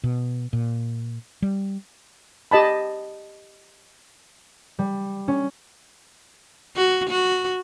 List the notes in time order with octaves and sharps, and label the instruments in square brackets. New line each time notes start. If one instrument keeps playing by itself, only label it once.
[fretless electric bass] B2
A#2
G3
[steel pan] G4 D#5 A5 B5
[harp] G3
C#4
[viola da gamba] F#4
F#4